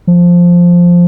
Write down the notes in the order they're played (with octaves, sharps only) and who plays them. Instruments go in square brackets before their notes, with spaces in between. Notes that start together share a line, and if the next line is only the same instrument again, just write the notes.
[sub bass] F3